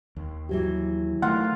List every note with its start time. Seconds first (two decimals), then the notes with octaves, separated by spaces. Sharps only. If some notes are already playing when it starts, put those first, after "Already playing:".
0.16 D#2
0.49 E3 F#3 G4
1.22 D#3 A3 F4 F#5